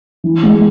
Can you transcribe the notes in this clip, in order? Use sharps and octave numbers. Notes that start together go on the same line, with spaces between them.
E3
G#3